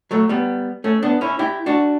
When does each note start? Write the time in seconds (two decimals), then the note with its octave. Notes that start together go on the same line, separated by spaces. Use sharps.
0.11 F#3 A3
0.29 G3 B3
0.84 A3 C#4
1.02 B3 D4
1.21 C#4 E4
1.39 E4 G4
1.66 D4 F#4